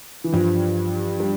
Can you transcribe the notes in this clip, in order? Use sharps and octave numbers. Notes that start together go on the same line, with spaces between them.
E3
G2 F3
G3